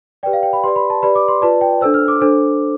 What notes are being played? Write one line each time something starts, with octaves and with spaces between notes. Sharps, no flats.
G4 B4 D5 G5
F5
G5
B5
G4 B4 D5 C6
B5
A5
G4 B4 D5 B5
D6
C6
F4 B4 D5 A5
G5
D4 A4 C5 E6
F6
D6
D4 A4 C5